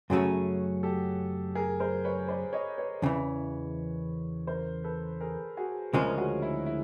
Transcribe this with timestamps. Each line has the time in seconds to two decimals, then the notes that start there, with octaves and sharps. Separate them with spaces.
0.10 F#2 C#3 F#3 A3 C#4 F#4 G#4
0.83 G4 A4
1.55 G#4 A#4
1.80 A#4 C5
2.04 B4 C#5
2.28 C5 D5
2.53 C#5 D#5
2.78 B4 C#5
3.02 E2 C#3 E3
4.47 A#4 C5
4.84 A4 B4
5.20 G#4 A#4
5.57 F#4 G#4
5.93 D2 C#3 F3 G#3 C#4 G#4 A#4
6.18 F#4 G#4
6.42 E4
6.66 E4